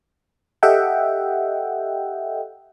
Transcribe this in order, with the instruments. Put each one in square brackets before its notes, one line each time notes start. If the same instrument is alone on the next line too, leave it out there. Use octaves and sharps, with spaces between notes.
[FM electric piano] G4 A4 D#5 E5 F#5 G5